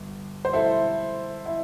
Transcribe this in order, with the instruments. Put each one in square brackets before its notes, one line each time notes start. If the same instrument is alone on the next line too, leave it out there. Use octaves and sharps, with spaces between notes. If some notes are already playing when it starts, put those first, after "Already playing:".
Already playing: [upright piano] G1
C5
E4 A4
E4